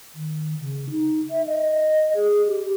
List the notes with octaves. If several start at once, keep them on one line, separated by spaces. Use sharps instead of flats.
D#3
C#3
D#4
E5
D#5
G#4
G4